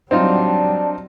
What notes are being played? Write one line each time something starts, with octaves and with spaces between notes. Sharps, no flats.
F#3 G3 C4 D4 D#4 F4